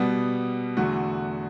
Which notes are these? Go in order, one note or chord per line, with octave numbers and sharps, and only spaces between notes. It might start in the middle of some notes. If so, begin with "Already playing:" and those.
Already playing: B2 G3 B3
E2 D3 A3 F#4